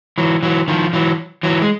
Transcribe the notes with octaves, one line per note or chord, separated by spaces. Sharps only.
E3 F#3
E3 F#3
D#3 F3
E3 F#3
E3 F#3
G#3